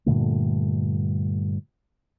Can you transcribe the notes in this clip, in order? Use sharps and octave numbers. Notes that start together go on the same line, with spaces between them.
G2 A#2 D3 A3